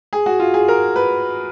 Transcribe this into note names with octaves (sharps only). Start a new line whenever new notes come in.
G#4
F#4
F4
G#4
A#4
B4